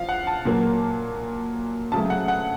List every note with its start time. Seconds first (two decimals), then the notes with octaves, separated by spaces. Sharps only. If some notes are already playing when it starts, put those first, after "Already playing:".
Already playing: F3 F5
0.09 F#5
0.27 A5
0.45 A#2 F#3 A#3
1.92 C#3 F#3 A3 A5
2.10 F#5
2.28 F#5